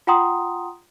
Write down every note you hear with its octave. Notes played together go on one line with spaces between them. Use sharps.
F4 F#5 G5 A#5 C6 D#6